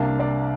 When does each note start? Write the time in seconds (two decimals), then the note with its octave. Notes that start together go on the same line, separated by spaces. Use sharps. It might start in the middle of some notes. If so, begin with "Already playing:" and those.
Already playing: C2 C3 A#3 D4 F5
0.20 D5